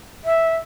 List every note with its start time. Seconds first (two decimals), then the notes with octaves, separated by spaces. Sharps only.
0.25 E5